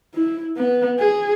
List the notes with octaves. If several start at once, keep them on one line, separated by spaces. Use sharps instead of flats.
E4
B3
G#4